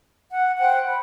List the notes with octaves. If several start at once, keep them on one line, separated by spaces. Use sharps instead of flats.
F#5
C5 F#5 G5 F#6
B5